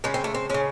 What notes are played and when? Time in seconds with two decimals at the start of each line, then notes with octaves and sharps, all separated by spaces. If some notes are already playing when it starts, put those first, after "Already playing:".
0.04 C#3 G#3 C#4
0.14 C4
0.24 A3
0.35 C4
0.50 C#3 G#3 C#4